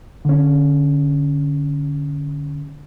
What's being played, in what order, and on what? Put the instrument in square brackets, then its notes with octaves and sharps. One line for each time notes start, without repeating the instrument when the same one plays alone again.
[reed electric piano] D3 C#4